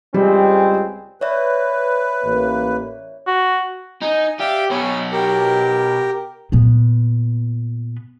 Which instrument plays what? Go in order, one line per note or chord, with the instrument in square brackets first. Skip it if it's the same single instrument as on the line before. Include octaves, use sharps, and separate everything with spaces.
[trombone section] C#2 G#3 C4 [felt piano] G3
[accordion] B4 [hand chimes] C#5 D5 E5
[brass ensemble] A1 A#3
[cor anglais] F#4
[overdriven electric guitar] D#4 [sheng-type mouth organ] G#5
[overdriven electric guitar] G4 [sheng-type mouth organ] D5 E5 F5
[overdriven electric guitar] B2 C#5 [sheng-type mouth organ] G#5 B5
[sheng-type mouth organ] G4 A#4
[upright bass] A#2 B3